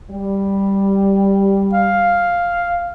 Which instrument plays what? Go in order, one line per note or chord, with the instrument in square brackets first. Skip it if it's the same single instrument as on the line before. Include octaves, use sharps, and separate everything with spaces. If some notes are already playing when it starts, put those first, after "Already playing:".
[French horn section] G3
[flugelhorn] F5